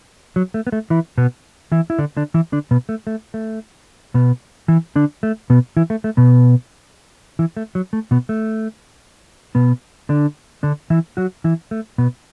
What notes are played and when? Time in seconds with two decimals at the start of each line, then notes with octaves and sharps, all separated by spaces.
0.36 F#3
0.54 A3
0.67 B3
0.72 A3
0.90 E3 E4
1.18 B2 B3
1.72 E3 E4
1.90 E4
1.99 D3 D4
2.17 D3 D4
2.34 E3 E4
2.52 D3 D4
2.71 B2 B3
2.89 A3
3.07 A3
3.34 A3
4.14 B2 B3
4.68 E3 E4
4.96 D3 D4
5.23 A3
5.50 B2 B3
5.77 E3 E4
5.90 A3
6.04 A3
6.17 B2 B3
7.39 E3 E4
7.57 A3
7.75 F#3
7.93 A3
8.11 B2 B3
8.29 A3
9.55 B2 B3
10.09 D3 D4
10.63 D3 D4
10.90 E3 E4
11.17 F#3 F#4
11.44 E3 E4
11.71 A3
11.98 B2 B3